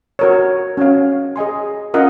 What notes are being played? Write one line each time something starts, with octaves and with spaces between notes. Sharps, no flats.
F#4 A#4 C#5
C#4 F#4 C#5 F5
G#4 D#5 G#5 C6
C#4 F4 A#4 D#5 F#5